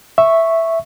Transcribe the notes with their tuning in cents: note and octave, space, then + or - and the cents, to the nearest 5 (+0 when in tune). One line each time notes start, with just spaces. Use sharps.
E5 +0 C#6 -5